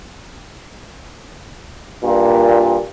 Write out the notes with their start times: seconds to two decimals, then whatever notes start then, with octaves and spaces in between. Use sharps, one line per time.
2.04 G2 A#2